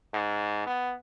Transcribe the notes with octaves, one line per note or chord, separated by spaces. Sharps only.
G#2
B3